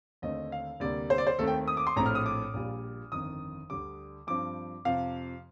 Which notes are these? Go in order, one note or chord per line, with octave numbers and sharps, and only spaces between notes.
D#2 D3 A3 C4 D#5
F5
D2 C3 G3 A#3 D5
C5
D5
C5
D#2 D#3 A3 C4 A4
G5
D#6
D6
C6
A#1 A2 A3 C4 A#5
F6
D#6
D6
A#1 A#2 G3
G1 F2 D#3 D#6
D2 D3 G3 D6
G2 F3 C4 D6
F2 C3 F3 F5